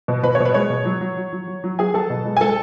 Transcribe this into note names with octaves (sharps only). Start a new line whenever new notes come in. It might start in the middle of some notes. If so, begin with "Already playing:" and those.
B2
B2 B4
C#5
B2
B4
G#3 C#5
B2
F#3
F#3
F#3
F#3
F#3
F#3
F#3 G#4 G#5
F#3 A4 A5
B2
G#3
G#5
G#3 A4 A5